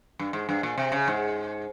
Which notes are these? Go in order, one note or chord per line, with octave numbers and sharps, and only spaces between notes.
G2
G#2
G2
A#2
C3
C#3
G#2